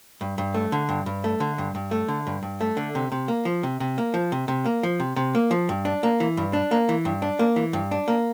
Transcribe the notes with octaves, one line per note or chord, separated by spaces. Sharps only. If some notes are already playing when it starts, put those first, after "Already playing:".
G2
G2
A3
D3
G2
G2
A3
D3
G2
G2
A3
D3
G2
G2
A3
D3
C3
C3
A#3
F3
C3
C3
A#3
F3
C3
C3
A#3
F3
C3
C3
A#3
F3
G2
D4
A#3
E3
G2
D4
A#3
E3
G2
D4
A#3
E3
G2
D4
A#3